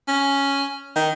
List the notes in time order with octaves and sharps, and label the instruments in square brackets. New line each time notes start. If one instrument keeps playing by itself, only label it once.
[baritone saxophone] C#4
D#3